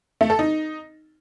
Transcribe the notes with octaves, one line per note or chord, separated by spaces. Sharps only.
A3
A4
D#4